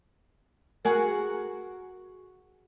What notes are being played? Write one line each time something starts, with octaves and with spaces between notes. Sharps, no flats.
F#4 G#4 A#4